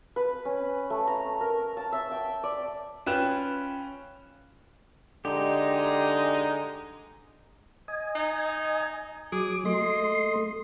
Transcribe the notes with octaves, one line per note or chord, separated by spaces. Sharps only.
B4
C#4
A3
A#5
A#4
A5
E5
G5
D5
C#4 F4 B4 G5 F#6 E7
D3 G#3 D#4 G4
D#5 G#5
D#4
F#3 G#4 D6
A3 D#5 C6